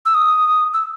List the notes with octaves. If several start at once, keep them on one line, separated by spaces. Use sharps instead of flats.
E6
D#6
E6